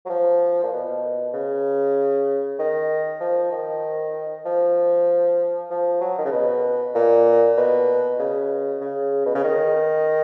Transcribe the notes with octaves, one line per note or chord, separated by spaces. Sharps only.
F#3
F3
A#2
B2
C#3
D#3
F3
D#3
F3
F3
F#3
D#3
C#3
B2
A#2
B2
C#3
C#3
B2
C#3
D#3